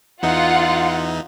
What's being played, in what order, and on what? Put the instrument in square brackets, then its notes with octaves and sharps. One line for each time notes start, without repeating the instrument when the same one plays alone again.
[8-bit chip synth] E2 E3 D#4 [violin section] F4 F#5